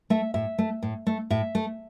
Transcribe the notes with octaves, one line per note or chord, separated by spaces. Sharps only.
A3 E5
A2 E5
A3
A2
A3
A2 E5
A3